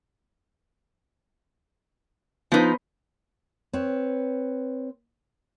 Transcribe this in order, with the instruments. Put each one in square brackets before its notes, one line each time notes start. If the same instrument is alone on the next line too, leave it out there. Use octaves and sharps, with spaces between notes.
[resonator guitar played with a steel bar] F3 D#4 [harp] B3 B4 C5
[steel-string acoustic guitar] C4 B4 C#5